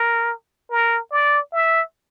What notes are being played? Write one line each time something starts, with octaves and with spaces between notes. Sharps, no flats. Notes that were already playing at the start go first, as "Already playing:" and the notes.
Already playing: A#4
A#4
D5
E5